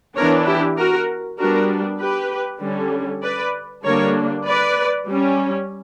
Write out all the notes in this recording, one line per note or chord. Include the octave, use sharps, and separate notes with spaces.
E3 B3 D4 A#4 C#5
E4 G4
F#4 A#4
G3 B3 D4 F#4 A#4
G4 B4
D3 G3 C#4
B4 D5
D3 G3 A#3 D4 A#4 C#5
B4 D5
G3 C#4